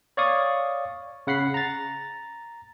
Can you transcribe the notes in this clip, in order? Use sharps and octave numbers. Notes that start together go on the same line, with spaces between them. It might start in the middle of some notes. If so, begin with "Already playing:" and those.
C#5 D5 F5 C#6 D#6
C#3 F#5 B5 C7
A#5 A6